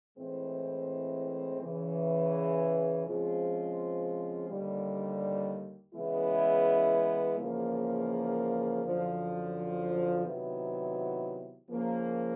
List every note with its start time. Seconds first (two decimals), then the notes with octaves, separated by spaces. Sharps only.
0.17 A2 E3 G#3 C4
1.61 E2 C#3 E3
3.06 C#3 F3 G#3 C4 F4
4.49 D#2 D3 G3
5.93 C#3 E3 G#3 B3 E4
7.38 E2 C#3 F3 A#3
8.82 F#2 D3 F3
10.25 C3 D#3 F#3 B3 E4
11.70 C#3 F3 A#3